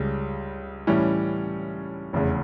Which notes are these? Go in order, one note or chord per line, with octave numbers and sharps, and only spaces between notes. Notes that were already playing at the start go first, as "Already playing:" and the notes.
Already playing: C#2 C#3 G3
A2 E3 G3 C#4
F1 E2 C#3